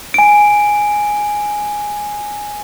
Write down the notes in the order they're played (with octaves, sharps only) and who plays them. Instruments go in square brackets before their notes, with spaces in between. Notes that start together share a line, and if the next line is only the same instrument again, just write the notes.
[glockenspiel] G#5 D7